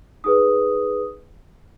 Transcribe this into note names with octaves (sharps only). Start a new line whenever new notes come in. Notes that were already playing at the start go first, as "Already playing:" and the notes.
D#4 G#4 B4 D#6